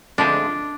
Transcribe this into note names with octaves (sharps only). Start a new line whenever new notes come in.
D2 D3 F3 G#3 C4 D4